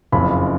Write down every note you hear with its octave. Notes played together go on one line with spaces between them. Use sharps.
F#1 F2 C#3 B5